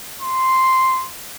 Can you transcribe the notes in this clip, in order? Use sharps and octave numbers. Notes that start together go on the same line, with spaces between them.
C6